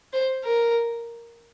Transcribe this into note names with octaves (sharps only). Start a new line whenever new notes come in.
C5
A#4